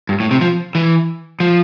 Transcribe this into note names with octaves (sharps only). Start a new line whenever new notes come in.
G2
A2
C3
F3
E3
F3